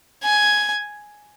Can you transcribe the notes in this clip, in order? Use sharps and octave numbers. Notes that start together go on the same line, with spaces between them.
G#5